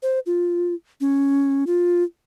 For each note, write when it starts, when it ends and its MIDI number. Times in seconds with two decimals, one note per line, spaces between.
0.03 0.19 72
0.26 0.75 65
1.01 1.64 61
1.67 2.03 65